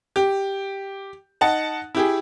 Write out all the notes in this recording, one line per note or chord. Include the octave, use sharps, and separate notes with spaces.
G4
D#4 F#5 A5
E4 G4 G#4